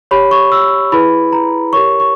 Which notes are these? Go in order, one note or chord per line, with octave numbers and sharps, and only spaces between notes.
G4 C#5 B5
C#6
E6
E4 G#4 B4 B5
A#5
G4 A#4 C#5 C#6
C#6